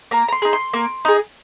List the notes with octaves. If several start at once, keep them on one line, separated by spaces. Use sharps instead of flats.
A#3 A#5
A#5
C6
D#4 G#4
C6
A#3
D#4 G#4